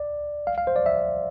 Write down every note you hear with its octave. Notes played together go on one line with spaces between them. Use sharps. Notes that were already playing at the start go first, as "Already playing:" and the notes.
Already playing: D5
F5
F5
C5
D5
E5